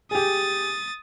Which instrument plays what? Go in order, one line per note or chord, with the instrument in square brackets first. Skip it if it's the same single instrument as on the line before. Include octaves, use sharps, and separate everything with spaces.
[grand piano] G4 G#4 [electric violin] D#6 A6